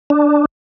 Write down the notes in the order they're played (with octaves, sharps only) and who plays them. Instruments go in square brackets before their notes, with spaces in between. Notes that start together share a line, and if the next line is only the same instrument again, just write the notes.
[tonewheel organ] D4